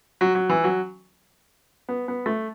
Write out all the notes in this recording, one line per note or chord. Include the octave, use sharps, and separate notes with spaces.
F#3
F#3
E3
F#3
B3
B3
A3